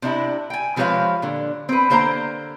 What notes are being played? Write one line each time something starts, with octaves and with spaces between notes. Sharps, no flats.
C3 D4 E4 D#5
G5 G#5
C3 F3 G#3 B4 C#5 F5
A#2 D3
C4 B4
D3 A#3 C5 G5 A#5